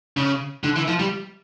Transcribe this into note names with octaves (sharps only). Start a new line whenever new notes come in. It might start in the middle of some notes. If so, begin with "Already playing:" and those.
C#3
D3
E3
F3
G3